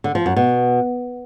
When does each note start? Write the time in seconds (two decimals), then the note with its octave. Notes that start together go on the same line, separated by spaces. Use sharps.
0.04 D3
0.15 F3
0.26 F#2
0.36 B2